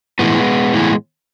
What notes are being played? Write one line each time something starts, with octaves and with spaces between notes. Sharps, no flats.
A2 E3 G#3 B3
A2 E3